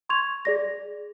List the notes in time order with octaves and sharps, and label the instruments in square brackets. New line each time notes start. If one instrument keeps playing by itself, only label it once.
[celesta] C6 C#6 G#6 F7
G#4 D5 A#6